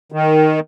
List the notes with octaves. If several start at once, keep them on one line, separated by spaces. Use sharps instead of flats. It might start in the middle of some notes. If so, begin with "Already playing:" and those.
D#3